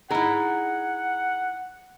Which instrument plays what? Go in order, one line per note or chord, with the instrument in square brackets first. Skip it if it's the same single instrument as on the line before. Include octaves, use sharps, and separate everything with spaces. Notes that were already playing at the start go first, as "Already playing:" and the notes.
[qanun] D#4 E4 [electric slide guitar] G#4 A#5 [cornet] F#5